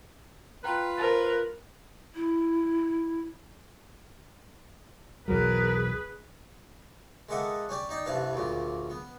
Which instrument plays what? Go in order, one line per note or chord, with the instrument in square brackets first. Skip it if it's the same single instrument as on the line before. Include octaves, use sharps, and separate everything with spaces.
[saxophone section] F4 B4 [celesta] G5 A#5
[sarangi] A#4 [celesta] C5 A6
[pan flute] E4
[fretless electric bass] B1 E2 F#3 [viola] G#4 B4 [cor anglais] A#4
[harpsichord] G#3 A#3 A4 E5 F#5 D#6
C#4 G4 D5
D#4 D5 G5
A1 G2 C3 B4 F5 A5
D2 A#2 C#3 F4
B3